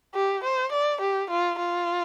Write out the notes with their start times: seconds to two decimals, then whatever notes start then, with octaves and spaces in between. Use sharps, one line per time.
0.14 G4
0.44 C5
0.72 D5
1.01 G4
1.30 F4
1.59 F4